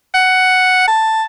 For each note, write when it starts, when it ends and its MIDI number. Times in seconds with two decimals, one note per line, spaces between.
0.14 0.87 78
0.88 1.25 81